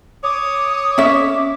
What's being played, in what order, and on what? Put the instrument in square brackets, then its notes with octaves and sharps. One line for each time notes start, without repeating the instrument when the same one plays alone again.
[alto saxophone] C#5 [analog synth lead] D6 [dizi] D#6
[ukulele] C#4 E5